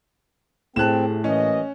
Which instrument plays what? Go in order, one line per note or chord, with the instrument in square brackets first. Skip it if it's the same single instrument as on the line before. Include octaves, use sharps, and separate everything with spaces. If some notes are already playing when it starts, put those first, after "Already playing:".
[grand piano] A2 A5 [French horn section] C3 A3 G#4 [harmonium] C4 [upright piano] F#6 E7
[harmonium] E3 [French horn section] G3 A#3 D#5 [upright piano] C#4